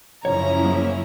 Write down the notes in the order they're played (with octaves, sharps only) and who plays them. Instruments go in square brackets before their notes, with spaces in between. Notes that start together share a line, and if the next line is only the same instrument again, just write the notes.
[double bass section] F#1 C#3 F3 [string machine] C#4 E4 [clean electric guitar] C#5 [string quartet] A#5
[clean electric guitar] F#3 G#3 A#3